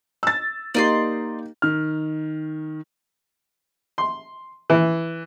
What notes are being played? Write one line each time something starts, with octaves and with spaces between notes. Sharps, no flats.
E6 A6
A#3 D#4 G4 D5 D#5 C6
D#3 F6
C6
E3